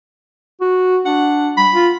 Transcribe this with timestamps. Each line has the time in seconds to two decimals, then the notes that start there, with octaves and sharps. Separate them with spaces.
0.61 F#4
1.05 D4 F#5
1.57 G3 B5
1.72 F4